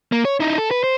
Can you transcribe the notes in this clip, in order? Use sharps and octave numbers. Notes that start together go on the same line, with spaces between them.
A#3
C#5
D#4 E4
A4
B4
C5